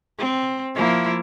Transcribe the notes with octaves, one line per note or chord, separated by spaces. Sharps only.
C4
F3 A#3 E4